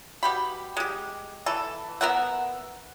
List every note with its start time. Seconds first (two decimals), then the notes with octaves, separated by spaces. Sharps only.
0.23 B2 G4 B5
0.77 G#3 G4
1.46 E3 A4
2.01 B3 A#4 E5 F#5